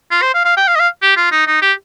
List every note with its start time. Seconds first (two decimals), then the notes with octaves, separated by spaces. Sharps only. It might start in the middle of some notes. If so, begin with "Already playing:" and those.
0.11 F4
0.22 C5
0.34 F5
0.45 F5
0.57 G5
0.67 F5
0.75 D#5
0.80 F5
1.02 G4
1.17 F4
1.32 D#4
1.47 D#4
1.62 G4